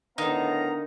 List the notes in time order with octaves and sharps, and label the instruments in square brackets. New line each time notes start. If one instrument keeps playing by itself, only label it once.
[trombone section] A2 B3 [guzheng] D3 D#3 [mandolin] D#4 [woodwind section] F5 A#5